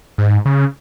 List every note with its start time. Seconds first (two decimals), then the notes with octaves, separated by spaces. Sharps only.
0.18 G#2
0.45 C#3